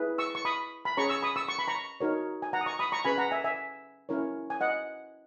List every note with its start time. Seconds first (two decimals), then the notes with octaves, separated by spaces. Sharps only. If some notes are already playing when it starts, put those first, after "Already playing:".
Already playing: E4 G#4 B4
0.18 C#6 E6
0.35 C#6
0.45 B5 D#6
0.85 B5
0.97 C#4 G#4 C#5 A#5 C#6
1.09 C#6 E6
1.22 B5 D#6
1.36 C#6 E6
1.48 C#6
1.59 B5
1.68 A#5 C#6
2.00 D#4 F#4 A#4 C#5
2.42 G#5
2.53 F#5 A#5
2.61 D#6
2.66 A#5 C#6
2.79 B5 D#6
2.92 A#5 C#6
3.05 C#4 G#4 B4 G#5 B5
3.18 F#5 A#5
3.31 E5 G#5
3.44 E5 G#5
4.09 C#4 E4 A#4 C#5
4.50 G#5
4.61 D#5 F#5